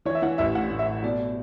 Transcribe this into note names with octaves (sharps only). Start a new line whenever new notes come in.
E3 C#5
E5
E3 F#5
A1 E5
A2 F#5
A2
E5
A2
B2 D5